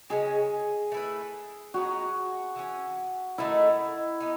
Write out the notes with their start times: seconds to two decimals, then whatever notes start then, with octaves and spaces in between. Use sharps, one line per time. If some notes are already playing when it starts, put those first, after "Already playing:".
0.10 C#3 G#3 C#4 G#4
0.92 A3 E4 B4
1.74 F#3 B3 D#4 F#4
2.56 E3 A3 C#4
3.38 D#3 A3 D#4 E4 A4
4.20 B3 D#4